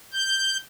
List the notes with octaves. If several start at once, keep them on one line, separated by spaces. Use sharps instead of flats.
G6